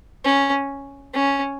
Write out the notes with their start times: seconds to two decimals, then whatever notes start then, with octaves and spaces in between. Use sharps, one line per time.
0.24 C#4
1.14 C#4